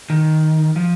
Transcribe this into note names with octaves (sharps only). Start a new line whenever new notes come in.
D#3
F3